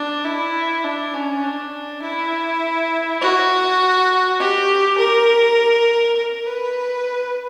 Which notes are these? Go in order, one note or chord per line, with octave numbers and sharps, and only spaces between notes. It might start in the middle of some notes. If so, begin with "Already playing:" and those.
Already playing: D4
E4
D4
C#4
D4
E4
F#4
G4
A#4
A#4
B4